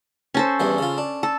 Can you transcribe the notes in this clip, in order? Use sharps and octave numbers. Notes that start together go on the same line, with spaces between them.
C#4 A4 C5
E2 G2 E3
C#3 F4
D4
A4